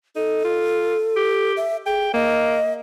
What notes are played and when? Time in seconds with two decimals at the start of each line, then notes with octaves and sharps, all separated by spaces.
0.16 D#4 A4
0.44 F4
1.16 G4
1.57 E5
1.86 G#4 G5
2.14 A#3 D#5